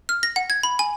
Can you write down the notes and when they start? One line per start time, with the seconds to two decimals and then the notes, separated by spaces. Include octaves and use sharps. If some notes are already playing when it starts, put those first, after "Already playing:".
0.09 F6
0.23 A#6
0.36 F#5
0.50 G#6
0.63 B5
0.79 G#5